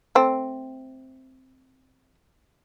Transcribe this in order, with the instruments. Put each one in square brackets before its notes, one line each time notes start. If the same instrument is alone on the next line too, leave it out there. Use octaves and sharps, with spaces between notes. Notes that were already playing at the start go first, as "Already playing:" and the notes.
[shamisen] A3 C4